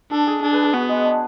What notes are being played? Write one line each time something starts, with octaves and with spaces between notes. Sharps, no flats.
D4 A4
G#4
D4 G#4
B4
G#4
B3 F#4
G#3
D4